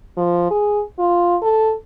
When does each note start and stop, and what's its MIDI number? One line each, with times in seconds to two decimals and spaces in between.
0.17 0.48 53
0.51 0.83 68
0.99 1.36 65
1.42 1.73 69